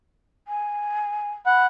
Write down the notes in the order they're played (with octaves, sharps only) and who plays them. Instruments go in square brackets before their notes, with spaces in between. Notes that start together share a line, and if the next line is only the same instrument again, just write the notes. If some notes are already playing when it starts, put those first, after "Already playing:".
[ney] G#5
[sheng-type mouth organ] F#5 [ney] B5